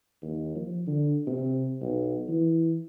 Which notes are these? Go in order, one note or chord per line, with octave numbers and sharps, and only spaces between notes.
D#2
F3
D3
C3
B1
E3